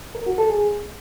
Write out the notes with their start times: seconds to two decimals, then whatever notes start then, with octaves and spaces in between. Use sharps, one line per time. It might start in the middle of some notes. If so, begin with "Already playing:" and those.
0.15 A#4
0.26 F#4
0.38 A4
0.50 G#4